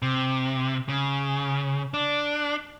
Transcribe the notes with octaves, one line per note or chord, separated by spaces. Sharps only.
C3
C#3
D4